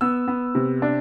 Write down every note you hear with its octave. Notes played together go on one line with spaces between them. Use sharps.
B3 E6
B3
C3
D4